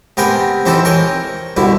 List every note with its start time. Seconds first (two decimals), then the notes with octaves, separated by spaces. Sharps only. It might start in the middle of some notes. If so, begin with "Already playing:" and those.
0.17 C3 B3 A#4 G5 G#5 B5
0.66 C3 E3 C4 D#4 A4
0.85 A#4 C#5 G5 G#5
1.57 C2 B2 D3 E4